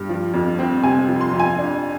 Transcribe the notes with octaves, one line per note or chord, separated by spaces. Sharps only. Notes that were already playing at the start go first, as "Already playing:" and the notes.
Already playing: G2
F3
F2
C4
C3 G#5
F3
C6
F2
G#5
D4